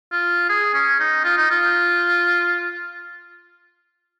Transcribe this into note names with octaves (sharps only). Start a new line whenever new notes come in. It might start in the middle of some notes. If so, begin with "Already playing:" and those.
F4
G#4
C#4
D#4
F4
D#4
F4